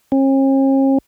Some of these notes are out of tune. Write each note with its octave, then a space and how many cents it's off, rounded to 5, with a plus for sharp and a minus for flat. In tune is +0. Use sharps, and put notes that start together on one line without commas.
C#4 -45